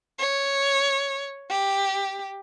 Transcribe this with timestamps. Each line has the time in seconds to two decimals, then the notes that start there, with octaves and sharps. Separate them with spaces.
0.19 C#5
1.50 G4